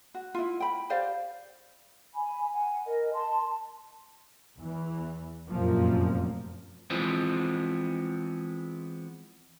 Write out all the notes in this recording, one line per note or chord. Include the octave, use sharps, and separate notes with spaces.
F#4
E4 F4
G5 B5
G4 C5 D5 F5
G#5 B5
F#5 G#5
A#4 D#5
A5 C6
E2 E3
F1 F#2 A#2 F3 A#3
E3 F3 G#3 B3 C4